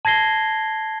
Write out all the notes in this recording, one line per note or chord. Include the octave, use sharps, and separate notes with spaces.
A5 G#6 A#6 C7 G7